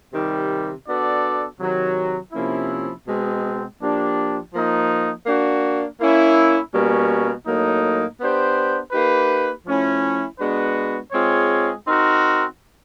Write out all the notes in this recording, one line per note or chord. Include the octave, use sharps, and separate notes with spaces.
C3 D#3 G3
B3 D4 F#4 A4 D5
C3 D#3 F#3
C3 F3 A#3 C#4 E4
B2 G#3 C4
F3 A#3 D4 G4
F3 A#3 D#4
A#3 D4 F#4
A#3 C#4 E4
B2 G3 A#3 C#4
A2 F#3 A#3 D#4
B3 D4 G4 C5
A#3 D#4 G4 B4
F3 A3 C#4 E4
G#3 B3 D4 F#4 B4
G#3 C4 F4 G#4 C#5
C4 D#4 F#4 A#4